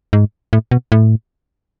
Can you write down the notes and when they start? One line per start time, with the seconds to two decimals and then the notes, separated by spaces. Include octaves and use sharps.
0.13 G#2
0.53 A2
0.71 B2
0.92 A2